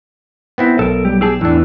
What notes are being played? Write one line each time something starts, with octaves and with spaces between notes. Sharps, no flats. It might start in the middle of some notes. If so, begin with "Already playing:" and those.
B3 C4 E4
B1 A4 A#4
G3 G4
G4 G#4 A5 E6
E2 A2 E3 D4